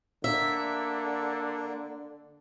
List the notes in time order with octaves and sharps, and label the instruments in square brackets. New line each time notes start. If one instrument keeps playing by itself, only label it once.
[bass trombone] D3 [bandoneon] A#3 [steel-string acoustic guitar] E5